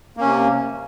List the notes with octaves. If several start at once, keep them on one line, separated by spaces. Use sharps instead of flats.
C3 A#3 C#4